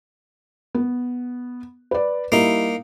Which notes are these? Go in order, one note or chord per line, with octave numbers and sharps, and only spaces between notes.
B3
B4 D5
G3 A#3 D#4 E4